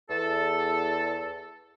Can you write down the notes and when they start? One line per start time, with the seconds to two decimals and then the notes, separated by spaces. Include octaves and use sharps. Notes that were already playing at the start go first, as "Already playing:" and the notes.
0.10 E2 A4